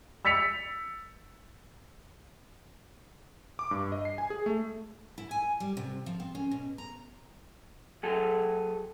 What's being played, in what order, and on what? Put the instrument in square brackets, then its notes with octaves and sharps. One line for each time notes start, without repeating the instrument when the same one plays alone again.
[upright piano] E6 A6 B6 C#7 F7
[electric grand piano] D6
G2
D#5
C7
G#5
G#4
A3
[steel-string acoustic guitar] E4
G#5
G3
C3
F3
C4
C#4
B2
A#5
[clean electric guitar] F#3 G#4 A4